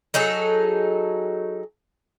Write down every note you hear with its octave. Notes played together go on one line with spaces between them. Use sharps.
F#3 D#4 G#4 A4